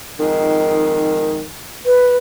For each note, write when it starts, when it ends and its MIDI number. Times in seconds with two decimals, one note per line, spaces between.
0.19 1.50 41
0.19 1.50 44
0.19 1.50 51
1.86 2.17 71